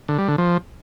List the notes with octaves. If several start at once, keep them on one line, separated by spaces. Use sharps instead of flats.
D3
G3
D3
F3